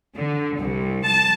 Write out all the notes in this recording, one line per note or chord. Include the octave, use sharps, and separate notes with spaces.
D3
C2
A5